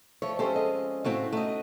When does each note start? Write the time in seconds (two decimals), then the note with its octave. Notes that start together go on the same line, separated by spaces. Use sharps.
0.22 F3 A3 C#5
0.39 G#3 C4 C#4 G4 A4 C5
0.56 D#5
1.04 A2 A3 C4 F4 F#4 C#5
1.32 A3 D#4 F#4 D#5